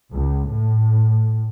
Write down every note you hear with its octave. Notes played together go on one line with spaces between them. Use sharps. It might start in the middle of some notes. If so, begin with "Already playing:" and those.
C#2
A2